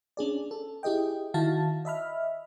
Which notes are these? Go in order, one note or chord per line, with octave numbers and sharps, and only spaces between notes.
C#4 D4 G#4 D5
A4
E4 G4 G#4 D#5 G5
D#3 E4 F#4 F5 A5 A6
D#5 E5 B5 F6